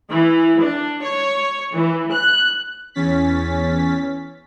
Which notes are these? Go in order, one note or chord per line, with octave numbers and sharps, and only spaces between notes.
E3
D4
C#5
E3
F#6
E2 C#4 A6 B6